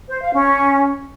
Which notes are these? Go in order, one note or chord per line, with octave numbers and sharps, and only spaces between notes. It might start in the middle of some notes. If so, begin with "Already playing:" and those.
C5
F5
C#4